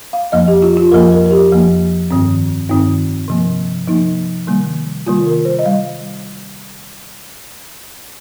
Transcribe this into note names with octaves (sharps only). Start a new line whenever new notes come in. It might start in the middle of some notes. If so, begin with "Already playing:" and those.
F5
F2 F3 A#3 D#5
G4
F4
F4
F2 F3 A#3 A#4
A#4
A#4
G4
F2 F3 A#3
G2 D#3 C4
G2 D#3 C4 D#4
C3 F3 A#3
C3 F3 A#3 D#4
C3 D#3 G3 A#3
C3 D#3 G3 A#3 F4
A#4
C5
D#5
G3 F5